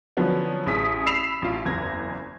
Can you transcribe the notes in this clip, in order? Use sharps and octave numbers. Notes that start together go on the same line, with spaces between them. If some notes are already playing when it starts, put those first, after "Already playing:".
D3 F3 F#3 B3 C#4
A1 G#4 D#6 B6
B5 E6 B6 C7 E7 F7
A1 F4
F#1 E2 G#6 A#6